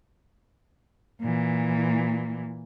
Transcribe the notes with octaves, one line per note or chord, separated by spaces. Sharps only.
A#2 E3